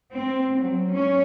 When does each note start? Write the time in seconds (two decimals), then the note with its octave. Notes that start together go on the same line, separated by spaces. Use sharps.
0.12 C4
0.57 F#3
0.91 C#4